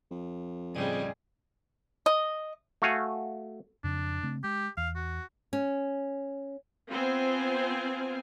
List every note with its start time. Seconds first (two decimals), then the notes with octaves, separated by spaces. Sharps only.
0.11 F2
0.75 A2 C#3 G3 C4 G#4 D5 D#5
2.06 D#5
2.82 A3 F#4 F5 G#5
3.84 F2 C#3 D4
4.23 C#3 A3 C4
4.44 G#3 G4
4.77 E2 F5
4.96 F#4
5.53 C#4
6.89 B3 C4 F4 C5 G#5